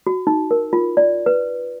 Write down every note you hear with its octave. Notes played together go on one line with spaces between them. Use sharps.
F#4
D#4
A#4
F4
D5
B4